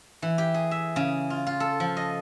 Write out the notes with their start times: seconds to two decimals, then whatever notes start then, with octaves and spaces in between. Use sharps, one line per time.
0.22 E3
0.38 G4
0.54 G#4
0.71 E5
0.96 C#3
1.30 F4
1.46 F4
1.60 A4
1.80 F3
1.97 D#5